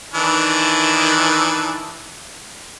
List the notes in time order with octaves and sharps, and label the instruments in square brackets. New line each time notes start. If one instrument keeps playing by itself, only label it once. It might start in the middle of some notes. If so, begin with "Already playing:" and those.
[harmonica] D#3 E3 D4